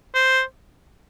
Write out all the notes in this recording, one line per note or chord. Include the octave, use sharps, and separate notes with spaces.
C5